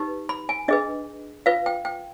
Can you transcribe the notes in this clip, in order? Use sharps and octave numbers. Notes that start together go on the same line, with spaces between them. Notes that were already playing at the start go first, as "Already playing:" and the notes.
Already playing: D#4 G4 B4
B5
G#5
D4 G#4 B4 D#5
F4 B4 F5
G5
G5